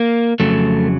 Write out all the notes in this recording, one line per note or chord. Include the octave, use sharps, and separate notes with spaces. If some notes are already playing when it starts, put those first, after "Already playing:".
Already playing: A#3
F2 C#3 F#3 A3